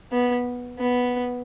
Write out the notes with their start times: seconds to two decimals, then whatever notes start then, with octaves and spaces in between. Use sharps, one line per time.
0.12 B3
0.79 B3